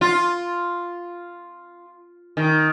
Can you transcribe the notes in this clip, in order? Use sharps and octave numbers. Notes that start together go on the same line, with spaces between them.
F4
D#3